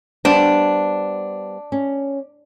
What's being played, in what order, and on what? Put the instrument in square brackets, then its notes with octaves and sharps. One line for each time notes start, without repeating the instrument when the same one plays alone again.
[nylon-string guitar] G3 B3 C5 [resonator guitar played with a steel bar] D4
[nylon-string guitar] C#4